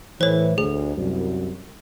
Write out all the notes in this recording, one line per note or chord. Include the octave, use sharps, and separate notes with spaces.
A2 E3 C5 C#5
D2 G#4
C2 F#2